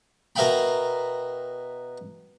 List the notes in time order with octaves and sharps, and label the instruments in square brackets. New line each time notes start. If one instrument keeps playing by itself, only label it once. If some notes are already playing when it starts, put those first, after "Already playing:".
[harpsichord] B2 A#4 E5 F5 G5 B5